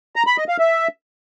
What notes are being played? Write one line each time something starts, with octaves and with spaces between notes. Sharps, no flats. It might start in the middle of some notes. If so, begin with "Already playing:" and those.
A#5
B5
D#5
F5
E5